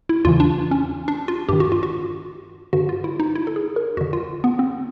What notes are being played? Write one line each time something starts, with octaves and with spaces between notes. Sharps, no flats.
E4
E2 C#3 E3 F4
D4
C#4
D4
F4
G2 D#3 G4
F#4
F4
F#4
G2 D3 F#4
F4
E4
D#4
E4
A4
G#4
A#4
F2 D3 F#4
F4
B3
C4